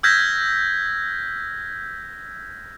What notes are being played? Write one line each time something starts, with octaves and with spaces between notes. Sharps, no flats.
E6 F6 G6 G#6 A#6 B6